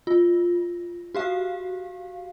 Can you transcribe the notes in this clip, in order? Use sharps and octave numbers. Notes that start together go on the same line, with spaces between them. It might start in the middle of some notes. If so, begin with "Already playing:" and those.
F4
F#4 G4 F5